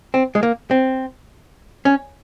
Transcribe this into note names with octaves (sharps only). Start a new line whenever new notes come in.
C4
G#3
A#3
C4
C#4